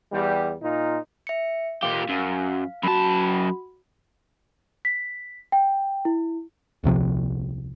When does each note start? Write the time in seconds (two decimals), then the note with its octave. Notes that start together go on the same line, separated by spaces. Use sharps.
0.12 E2 G3
0.62 A#2 D#4 F4
1.27 E5 C#7
1.83 A#2 G4 F5
2.09 F#2
2.83 F#2 F#4 A5 B5
4.85 B6
5.52 G5
6.05 E4
6.84 D#1 C2 C3 F3